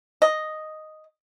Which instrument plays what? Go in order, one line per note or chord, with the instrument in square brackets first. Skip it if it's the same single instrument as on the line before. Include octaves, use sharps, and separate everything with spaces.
[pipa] D#5